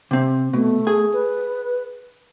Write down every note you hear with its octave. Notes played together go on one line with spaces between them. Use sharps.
C3 C4
B2 A3
G#4 G#5
B4